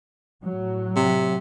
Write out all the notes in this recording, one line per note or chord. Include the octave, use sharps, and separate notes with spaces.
A2 F#3
C3